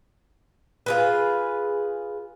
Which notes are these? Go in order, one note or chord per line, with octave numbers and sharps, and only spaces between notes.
F4 G#4 B4